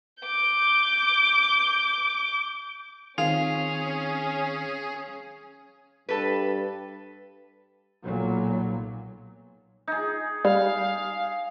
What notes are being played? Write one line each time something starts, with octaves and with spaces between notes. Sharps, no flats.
D6 G6
D#3 C4 C#4 F4 G#4
G2 A4 B4
B1 A#2 F#3
D#4 G#4
G3 F5